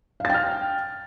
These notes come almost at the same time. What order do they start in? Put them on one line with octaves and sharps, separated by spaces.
F5 A6 G5 F6